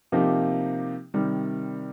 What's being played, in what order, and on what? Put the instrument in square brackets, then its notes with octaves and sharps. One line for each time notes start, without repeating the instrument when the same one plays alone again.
[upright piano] C3 F3 A#3 D#4 G4
C3 D#3 G3